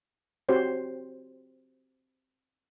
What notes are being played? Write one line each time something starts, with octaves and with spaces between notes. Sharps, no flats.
C4 F#4 G4 C5 C#5